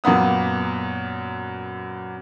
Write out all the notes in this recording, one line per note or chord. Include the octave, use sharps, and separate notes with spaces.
F#2 A#2 A#3 B3 D#6